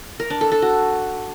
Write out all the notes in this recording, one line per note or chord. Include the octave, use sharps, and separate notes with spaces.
A#4
D4
A4
A4
F#4